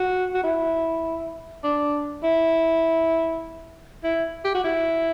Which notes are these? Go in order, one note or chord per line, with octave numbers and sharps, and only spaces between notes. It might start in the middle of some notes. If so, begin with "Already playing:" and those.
Already playing: F#4
F#4
E4
D4
E4
E4
G4
F#4
E4